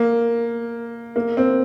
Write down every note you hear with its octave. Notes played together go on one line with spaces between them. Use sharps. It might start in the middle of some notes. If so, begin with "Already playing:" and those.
Already playing: A#3
A#3
C4